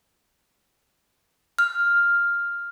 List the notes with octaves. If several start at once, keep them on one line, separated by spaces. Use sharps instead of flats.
F6